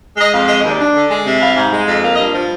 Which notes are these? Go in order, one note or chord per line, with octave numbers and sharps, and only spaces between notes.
G#3 D#5
F2 F5
G#3 D#5
D#5
D#2
D5
D4
D3
G#3
C3
G3 F5
F5
G#2
G#3
F2
A#3 F5
D#5
G2
F4
F3